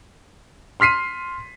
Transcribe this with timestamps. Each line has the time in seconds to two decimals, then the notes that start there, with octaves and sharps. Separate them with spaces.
0.80 C6 F6 B6 C7 D#7